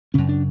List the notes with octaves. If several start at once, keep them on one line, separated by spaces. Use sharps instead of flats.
F#2 C#3 C#4
D4